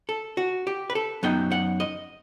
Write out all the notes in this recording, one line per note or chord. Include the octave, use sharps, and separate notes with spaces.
A4
F#4
G4
B4
A4
F#2 F#3 B3 D#4 G5
F#5
D#5